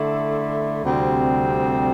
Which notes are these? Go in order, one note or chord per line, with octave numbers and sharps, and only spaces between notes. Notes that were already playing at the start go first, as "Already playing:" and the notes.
Already playing: D3 A3 E4
D2 C3 G3 C4